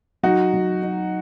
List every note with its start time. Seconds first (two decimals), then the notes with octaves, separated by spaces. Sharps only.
0.23 F#3 D#4 F#4
0.53 F#3
0.82 D#4